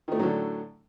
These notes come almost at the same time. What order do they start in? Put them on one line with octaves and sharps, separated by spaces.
D#3 A3 A2 F#3 D3